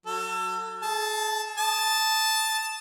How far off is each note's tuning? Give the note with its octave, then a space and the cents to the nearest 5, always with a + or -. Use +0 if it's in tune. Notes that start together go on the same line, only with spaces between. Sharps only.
F#3 +0 A4 +30
G#4 +40 A5 -5
A5 +0 D#6 +0